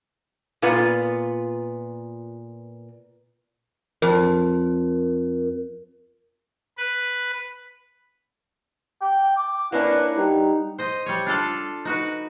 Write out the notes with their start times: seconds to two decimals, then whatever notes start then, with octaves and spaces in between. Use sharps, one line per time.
0.62 A#2 B3 F4 B4
4.02 F2 A#4
6.78 B4
9.01 G5
9.36 D6
9.72 A#3 C#4 D4 E4 B4 F#5
10.17 G3 D#4
10.78 C5 D#5
11.06 G3 C#5
11.26 D4 F4 A4 D5
11.85 D#4 F#4 B4